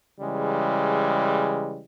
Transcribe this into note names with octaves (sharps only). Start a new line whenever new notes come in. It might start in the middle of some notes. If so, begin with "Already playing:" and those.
C#3 E3 G3 G#3